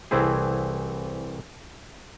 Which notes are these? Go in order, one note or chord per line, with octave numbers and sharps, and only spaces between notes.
C2 E3 A3 C4 E4 G#4